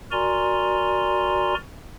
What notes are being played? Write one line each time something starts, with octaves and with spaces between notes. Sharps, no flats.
F#4 A#4 D5 G#5 A#5 C6